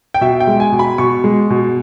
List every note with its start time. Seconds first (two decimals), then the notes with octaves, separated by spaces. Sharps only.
0.14 G5
0.21 B2 E5
0.40 G5
0.47 G#3
0.60 G#5
0.72 B2
0.79 B5
0.98 B2 C#6
1.24 G#3
1.50 B2